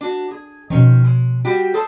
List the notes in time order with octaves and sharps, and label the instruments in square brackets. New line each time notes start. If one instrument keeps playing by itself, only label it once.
[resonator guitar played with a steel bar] D4 F#4
G#4
[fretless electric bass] B2 F3 [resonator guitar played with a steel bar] D#3 C#4 C5
[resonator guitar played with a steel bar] G#3
G3 F#4 G4
G#4 A4 C5